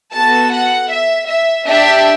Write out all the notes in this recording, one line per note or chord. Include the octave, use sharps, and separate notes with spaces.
B3 F#4 A4 A5
F#5
E5
E5
D4 G4 E5